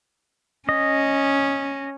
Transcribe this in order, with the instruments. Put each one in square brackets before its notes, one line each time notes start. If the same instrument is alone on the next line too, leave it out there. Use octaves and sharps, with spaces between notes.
[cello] C#4 [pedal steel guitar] D#5